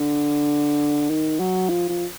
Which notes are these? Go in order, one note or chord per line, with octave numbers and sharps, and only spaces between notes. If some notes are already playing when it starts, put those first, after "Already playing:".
Already playing: D3
D#3
F#3
F3
F3